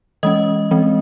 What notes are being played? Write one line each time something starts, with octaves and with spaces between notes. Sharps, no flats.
E3 G#3 C#4 D#5 D#6
E3 G#3 C4